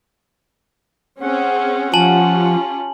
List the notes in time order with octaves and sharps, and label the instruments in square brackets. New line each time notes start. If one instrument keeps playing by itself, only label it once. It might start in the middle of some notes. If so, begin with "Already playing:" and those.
[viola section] C4 C#4 G#4 [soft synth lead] F#5
[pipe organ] F3 [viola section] C#4 F4 G4 [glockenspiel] G#5 A5 F#7